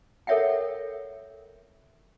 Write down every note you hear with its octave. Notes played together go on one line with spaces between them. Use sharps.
A4 A#4 C#5 E5 F#5 G5